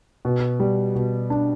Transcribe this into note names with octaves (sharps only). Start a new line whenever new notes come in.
B2
G3
B2
D4